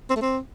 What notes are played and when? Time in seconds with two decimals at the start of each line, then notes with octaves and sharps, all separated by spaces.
0.10 C4
0.16 A3
0.22 C4